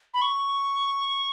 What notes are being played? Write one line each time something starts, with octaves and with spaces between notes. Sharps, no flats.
B5
C#6